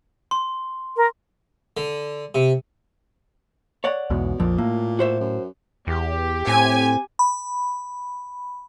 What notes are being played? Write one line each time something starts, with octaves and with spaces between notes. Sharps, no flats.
C6
A#4
D3
C3
C#5 D5 F#5
B1 E2 G#2 B2
A#1 F2 A#2 F3
A2 A#3
F#4 C5 E5
F#2
E2 G4
A2 C4 G#5
B5